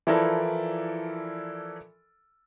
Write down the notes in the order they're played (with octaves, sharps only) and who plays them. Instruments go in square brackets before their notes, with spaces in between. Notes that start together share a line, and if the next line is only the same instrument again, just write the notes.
[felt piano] E3 F3 E4 A4 A#4 D5